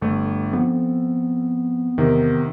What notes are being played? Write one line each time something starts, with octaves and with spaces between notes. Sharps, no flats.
G1 A3
F3 B3 C4 A4
E2 C3 D#3